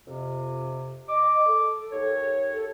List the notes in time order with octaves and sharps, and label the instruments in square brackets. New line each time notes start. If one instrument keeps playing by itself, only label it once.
[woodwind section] F2 C3
[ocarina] D#5 [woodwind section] D6
[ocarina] A4
[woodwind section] D#2 C#5
[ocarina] A4